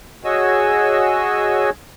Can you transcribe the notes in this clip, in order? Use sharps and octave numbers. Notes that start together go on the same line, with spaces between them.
F#4 G#4 C#5 D#5 G#5 E6